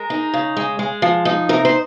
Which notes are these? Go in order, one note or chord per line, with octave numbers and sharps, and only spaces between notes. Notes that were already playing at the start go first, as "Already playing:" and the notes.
Already playing: G#3 A#4
D#4
C#3
G#3
G#3
F3
D#4
C3 A#4
C5